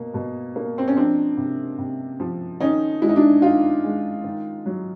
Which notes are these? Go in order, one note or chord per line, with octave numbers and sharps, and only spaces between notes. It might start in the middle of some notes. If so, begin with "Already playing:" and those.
Already playing: B2 A#3
B2
A#3
C4
C#4
F3 C4 D4
C3
C3
F3
D#3 C#4 D#4
G#3 E4
D#4
D4 E4
D#3 D#4 F4
G#3
D#3
F#3